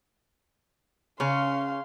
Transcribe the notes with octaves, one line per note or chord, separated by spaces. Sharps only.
C#3 C#4 F5 C6